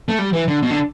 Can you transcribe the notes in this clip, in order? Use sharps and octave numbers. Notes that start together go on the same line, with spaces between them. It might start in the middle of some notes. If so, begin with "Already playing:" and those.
A3
G3
E3
D3
B2
D3